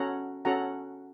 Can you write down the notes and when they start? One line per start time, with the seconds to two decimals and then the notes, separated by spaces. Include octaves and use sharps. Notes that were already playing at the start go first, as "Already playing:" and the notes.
Already playing: C#4 F#4 A4 F#5 A#5
0.45 C#4 F#4 A4 F#5 A#5